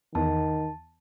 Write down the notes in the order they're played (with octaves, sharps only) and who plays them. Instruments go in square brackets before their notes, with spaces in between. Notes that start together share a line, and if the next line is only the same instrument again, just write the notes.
[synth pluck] E2 [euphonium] D#3 [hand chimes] A5